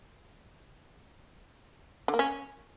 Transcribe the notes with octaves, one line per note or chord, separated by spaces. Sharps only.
D3
A#3
C#4